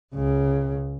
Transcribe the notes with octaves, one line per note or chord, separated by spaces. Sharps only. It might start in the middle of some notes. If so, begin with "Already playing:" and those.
C#2 C#3